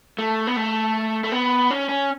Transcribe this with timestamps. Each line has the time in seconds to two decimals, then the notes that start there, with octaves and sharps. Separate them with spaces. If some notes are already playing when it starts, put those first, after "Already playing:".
0.19 A3
0.47 B3
0.56 A3
1.24 A3
1.32 B3
1.70 C#4
1.89 C#4